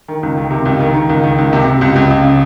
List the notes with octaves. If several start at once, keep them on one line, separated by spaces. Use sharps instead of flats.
D#3
C#2
D#3
C3
C#2
D#3
D#3
C#2
D#3
C#2
C3
C3
C#2
C#2
C#2
C#3